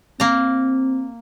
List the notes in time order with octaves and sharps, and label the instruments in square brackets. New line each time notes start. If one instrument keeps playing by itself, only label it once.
[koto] A#3 A#5 [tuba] C4